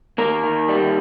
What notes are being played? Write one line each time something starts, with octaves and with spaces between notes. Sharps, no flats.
D#2 A#3 A#4
D#3
G3